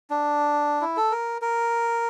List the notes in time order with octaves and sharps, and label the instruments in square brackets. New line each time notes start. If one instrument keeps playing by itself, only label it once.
[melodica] D4
E4
A4
A#4
A#4